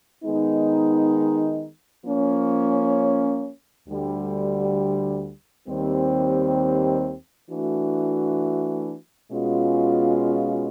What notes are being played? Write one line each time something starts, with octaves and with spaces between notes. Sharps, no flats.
D#3 G#3 B3 D#4
F3 A#3 C#4
D2 D3 G3
D#2 D#3 G3 C4
E3 A3 D4 F#4
B2 G#3 C#4 F4